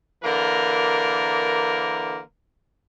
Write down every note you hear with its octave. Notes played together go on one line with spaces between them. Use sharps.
D3 E3 A#3 A#4